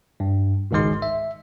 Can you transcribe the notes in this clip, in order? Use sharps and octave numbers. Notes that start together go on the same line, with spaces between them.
G2
G#1 C#2 G#2 D#3 G#3 C6
E5